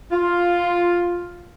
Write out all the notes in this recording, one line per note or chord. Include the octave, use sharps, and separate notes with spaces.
F4